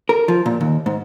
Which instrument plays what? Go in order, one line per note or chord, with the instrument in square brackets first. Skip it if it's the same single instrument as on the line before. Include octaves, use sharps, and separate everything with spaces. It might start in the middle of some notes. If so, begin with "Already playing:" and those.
[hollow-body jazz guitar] A#4
F3
A#2
D#2
G#2